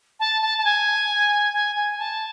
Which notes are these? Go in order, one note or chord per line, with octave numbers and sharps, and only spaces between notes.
A5
A5
A5
G#5
G#5
G#5
A5